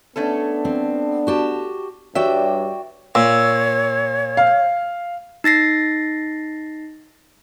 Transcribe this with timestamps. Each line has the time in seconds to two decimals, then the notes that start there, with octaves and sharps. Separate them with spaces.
0.16 A3 B3 C#4 D4 A4
0.65 C4
1.27 F#4 G4 A5
2.15 G2 G3 F#4 C#5 D5 E5 G5
3.15 A#2 C#5 E6
4.37 F5
5.44 D#4 A6 A#6 C7